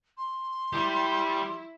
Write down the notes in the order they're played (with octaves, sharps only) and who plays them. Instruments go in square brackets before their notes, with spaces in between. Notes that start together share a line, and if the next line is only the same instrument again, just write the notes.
[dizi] C6
[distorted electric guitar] G3 G4 [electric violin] E4